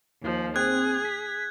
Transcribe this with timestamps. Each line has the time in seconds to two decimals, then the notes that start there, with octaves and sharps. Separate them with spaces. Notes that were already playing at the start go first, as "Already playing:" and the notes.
0.20 D#2 F3
0.56 C4 G#4 F#6 G#6
1.05 B6